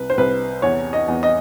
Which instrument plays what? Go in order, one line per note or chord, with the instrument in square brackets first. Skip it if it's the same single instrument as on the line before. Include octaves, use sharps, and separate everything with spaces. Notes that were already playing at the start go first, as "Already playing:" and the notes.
Already playing: [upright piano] C2 B4
C5
C2 B4
E2 C#5
D#5
E2
D#5